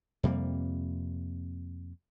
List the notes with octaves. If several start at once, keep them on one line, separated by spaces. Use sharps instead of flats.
F2 C3 G3 A#3